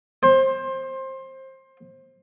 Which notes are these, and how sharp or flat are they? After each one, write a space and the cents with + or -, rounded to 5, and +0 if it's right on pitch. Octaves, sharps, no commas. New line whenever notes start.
C5 +20